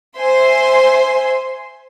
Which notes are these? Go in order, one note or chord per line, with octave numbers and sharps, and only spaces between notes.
C5 E5 G#5 C6